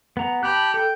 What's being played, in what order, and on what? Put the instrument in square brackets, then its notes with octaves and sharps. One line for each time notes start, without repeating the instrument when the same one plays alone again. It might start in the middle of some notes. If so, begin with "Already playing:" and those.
[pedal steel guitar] B3 A#5
[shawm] G4 [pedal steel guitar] A5 B5 F#6
[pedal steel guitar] A4 [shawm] G5